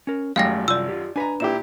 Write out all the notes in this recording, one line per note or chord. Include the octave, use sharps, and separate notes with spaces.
C#4 A#4
G#1 F#2 G3 A3 F5 G5 A#6
C2 F4 D5 C6 E6
F4 G4
D4 B4 G#5 A#5
A#2 E4 G4 E7